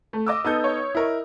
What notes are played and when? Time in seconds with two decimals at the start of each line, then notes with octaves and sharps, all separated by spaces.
0.13 A3
0.26 D#5 D6 E6
0.45 B3 D#4 A4 D#6 G6
0.64 C#5
0.95 E4 A#4 D#5